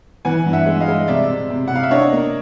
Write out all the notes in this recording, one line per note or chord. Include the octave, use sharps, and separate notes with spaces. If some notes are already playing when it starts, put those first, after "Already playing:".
E3 F#5 G#5
G2
E5 F#5
G#3
D#5 F5
G#3
C3 D5 E5
C3
C3
C3 F#5
F5
E5
D4 C#5 D#5
A#3